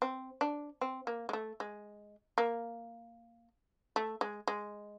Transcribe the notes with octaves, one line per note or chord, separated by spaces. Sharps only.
C4
D4
C4
A#3
G#3
A3
G#3
A#3
A3
G#3
G#3